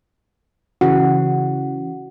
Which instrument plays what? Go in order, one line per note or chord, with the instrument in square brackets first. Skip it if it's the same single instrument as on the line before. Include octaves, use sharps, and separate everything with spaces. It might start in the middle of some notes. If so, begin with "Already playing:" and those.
[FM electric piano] C#3 E3 [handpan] F#4